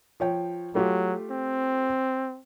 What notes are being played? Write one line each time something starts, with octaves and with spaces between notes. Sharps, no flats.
F3 C#5 G5
F#3 A3 F4 G4
C4